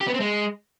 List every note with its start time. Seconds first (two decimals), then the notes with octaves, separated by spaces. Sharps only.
0.01 G4
0.07 B3
0.14 C4
0.20 G#3